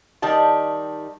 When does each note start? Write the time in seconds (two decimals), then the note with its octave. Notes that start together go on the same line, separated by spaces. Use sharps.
0.22 D#3 G3 A5